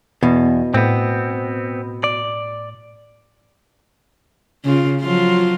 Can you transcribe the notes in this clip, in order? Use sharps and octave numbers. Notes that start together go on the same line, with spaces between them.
E2 B2
A2 B3 C4
D5
C#3 F4
F3 F#3 F4